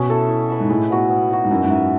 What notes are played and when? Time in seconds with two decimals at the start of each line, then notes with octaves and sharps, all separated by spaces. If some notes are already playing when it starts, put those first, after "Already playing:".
Already playing: B2 C#4
0.09 E4 A4 E5
0.29 E4
0.49 B4 E5
0.60 G#2
0.69 A2 G#3
0.90 B3 F#4 B4
1.10 B3
1.30 D#4 F#4
1.45 G#2
1.51 F#2 E4
1.64 G#2
1.70 B4 E5